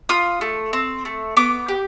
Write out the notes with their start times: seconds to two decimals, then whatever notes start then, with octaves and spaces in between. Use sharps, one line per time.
0.09 F4 D#6
0.41 A3
0.73 C4
1.05 A3
1.37 B3 D6
1.68 G4